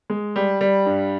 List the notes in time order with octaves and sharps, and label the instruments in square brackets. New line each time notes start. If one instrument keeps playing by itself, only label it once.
[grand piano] G#3
G3
G3
G2